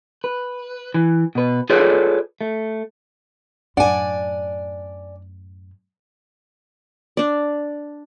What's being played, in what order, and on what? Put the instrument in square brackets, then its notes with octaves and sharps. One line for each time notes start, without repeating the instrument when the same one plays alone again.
[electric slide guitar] B4
E3
B2 B4
F4 G#4 A4 B4 C#5 D5
A3
[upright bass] F#2 A2 [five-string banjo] D4 F#5 [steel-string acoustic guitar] D5 G#5
[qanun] D4 D5